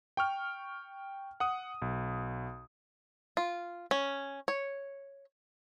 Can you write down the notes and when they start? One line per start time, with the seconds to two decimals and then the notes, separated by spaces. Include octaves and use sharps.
0.17 G5 C#6 F6
1.40 F#5 D#6
1.82 B1
3.37 F4
3.91 C#4
4.48 C#5